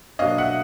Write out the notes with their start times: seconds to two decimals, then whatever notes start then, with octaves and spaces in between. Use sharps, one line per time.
0.19 B2 F#3 A#3 D4 D#5 F5
0.38 E5 F#5